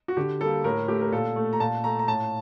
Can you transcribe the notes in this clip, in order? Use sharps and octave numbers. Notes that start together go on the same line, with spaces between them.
F#4
D3 G4
G3 A#3 A4
A2 A#4
A3 G4
A#4
A#2 A4
A3
A#5
A#2 A5
A3 A#5
A#5
A2 A5